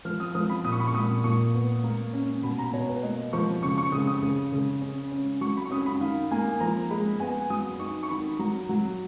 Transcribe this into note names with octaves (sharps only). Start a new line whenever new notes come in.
F3 F6
D#6
F3 D#6
B5
A#2 D#6
C#6
B5
C#6
A#2 D#6
A#2 C#6
B3
A#3
C#4
B2 B5
A#5
B2 C#5
B4
A#3 D#5
F3 C#6
C#3 C#6
C#6
C#3 D#6
D#6
C#3
C#3
C#4
C#4
F#3 C#6
B5
C#6
C#4 D#6
B5
D#3 F5
A#3 G#5
F3 A#5
G#3 B5
B3 G#5
F#3 D#6
D#4 C#6
C#6
D#3 B5
F#3 A#5
F#3